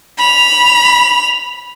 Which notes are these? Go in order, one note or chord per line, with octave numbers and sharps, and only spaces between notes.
B5 F7